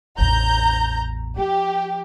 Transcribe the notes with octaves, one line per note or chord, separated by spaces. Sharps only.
A1 E2 A#5 G6
F3 G4